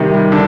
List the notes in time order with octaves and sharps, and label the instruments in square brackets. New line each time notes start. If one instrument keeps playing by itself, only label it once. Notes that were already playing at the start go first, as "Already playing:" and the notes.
Already playing: [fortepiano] C3 [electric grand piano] D#3 G3
[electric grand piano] G3
[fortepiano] D3